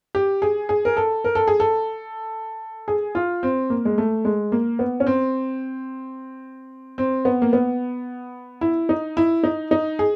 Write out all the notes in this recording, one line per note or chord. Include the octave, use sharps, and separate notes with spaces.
G4
G#4
G#4
A#4
A4
A#4
A4
G#4
A4
G#4
F4
C4
A#3
G#3
A3
G#3
A#3
B3
C#4
C4
C4
B3
A#3
B3
E4
D#4
E4
D#4
D#4
G#4